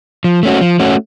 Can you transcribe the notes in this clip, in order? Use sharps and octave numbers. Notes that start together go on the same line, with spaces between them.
F3
A3 C#4 F#4
F3
A3 C#4 F#4